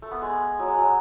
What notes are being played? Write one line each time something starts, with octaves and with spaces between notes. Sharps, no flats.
A3
B3
G#3
F#3
G#3
F#3